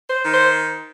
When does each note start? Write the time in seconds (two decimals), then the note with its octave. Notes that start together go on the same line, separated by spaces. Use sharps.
0.09 C5
0.25 D#3
0.33 C5